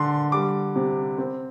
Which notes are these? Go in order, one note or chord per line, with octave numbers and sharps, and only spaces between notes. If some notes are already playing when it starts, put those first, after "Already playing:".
Already playing: D3 D4 C6
G3 D6
C3
C4